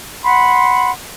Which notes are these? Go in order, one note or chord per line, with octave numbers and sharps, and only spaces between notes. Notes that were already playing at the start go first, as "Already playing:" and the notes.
F#5 B5 C6